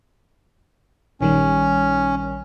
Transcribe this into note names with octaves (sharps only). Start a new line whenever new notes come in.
A#1 D#3 G3 C#4